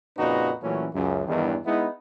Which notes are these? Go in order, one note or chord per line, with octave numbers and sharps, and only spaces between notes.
F2 A#2 C#3 D#4 F#4 B4
A#2 E3 F#3 A3 C#4
C#2 F#2
E2 G2 D#3
G#3 B3 D#4 E4